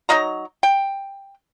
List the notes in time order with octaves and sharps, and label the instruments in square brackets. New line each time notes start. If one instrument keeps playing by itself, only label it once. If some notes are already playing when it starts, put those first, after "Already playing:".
[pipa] F#3 D#4 D#5 A#5
G5